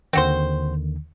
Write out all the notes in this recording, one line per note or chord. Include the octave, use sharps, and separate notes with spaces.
D#2 D3 D#3 C4 F#4 C5